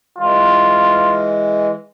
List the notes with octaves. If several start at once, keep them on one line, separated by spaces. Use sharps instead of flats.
E3 G#3 F4